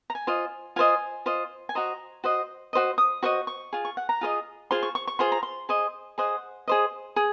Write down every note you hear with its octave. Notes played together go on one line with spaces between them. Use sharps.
A#5
G#5
F4 C5 D#5
F4 C5 D#5 G#5
F4 C5 D#5
G#5
F#4 C5 D#5 A#5
F#4 C5 D#5
F#4 C5 D#5
D#6
F#4 C5 D#5 C#6
C#6
F4 G#4
C#6
F#5
A#5
F4 G#4 C5 D#5
F4 G#4 C5 C6
C#6
C#6
C#6
F4 G#4 C5 C6
A#5
C6
G#4 C5 D#5
G#4 C5 D#5 F#5
G#4 C5 D#5
G#4